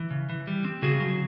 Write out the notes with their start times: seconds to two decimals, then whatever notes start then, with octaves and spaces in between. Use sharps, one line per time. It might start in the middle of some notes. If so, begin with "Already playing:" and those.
Already playing: E3
0.10 C#3
0.30 E3
0.47 G3
0.64 C4
0.82 C#3 F#4 G#4
1.00 F#3